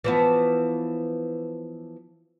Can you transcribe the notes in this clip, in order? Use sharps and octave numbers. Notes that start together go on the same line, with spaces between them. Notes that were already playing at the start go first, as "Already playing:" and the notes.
E3 F3 B3